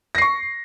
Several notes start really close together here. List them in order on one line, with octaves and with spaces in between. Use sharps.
A#6 C7 C#6